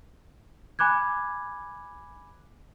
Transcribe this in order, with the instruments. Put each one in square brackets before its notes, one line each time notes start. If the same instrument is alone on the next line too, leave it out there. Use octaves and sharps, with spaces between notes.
[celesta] G#5 B5 D6 F#6 G#6